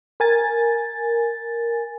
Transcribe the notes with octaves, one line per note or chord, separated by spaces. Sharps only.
A#4 G#5 A6